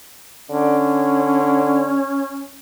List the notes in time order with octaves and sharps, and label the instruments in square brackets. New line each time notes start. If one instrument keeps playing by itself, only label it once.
[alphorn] D3 [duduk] C#4